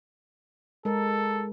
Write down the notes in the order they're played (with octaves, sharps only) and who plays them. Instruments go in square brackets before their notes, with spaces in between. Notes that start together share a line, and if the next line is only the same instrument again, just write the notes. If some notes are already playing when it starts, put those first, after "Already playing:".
[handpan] G#3 A#4 [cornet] A4